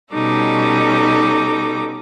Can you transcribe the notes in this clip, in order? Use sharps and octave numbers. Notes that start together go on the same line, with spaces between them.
B2 G3 C#4 D#4 A4 D6